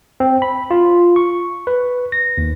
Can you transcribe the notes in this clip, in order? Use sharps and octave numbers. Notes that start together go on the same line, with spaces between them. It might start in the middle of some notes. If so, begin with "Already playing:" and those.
C4
B5
F4
C#6
B4
A#6
D#2